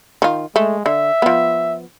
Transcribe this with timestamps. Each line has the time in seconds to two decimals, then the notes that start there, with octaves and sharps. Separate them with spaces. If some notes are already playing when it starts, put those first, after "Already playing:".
0.22 D#3 F4
0.56 G#3 A3
0.86 D3 E5
1.22 F3 B3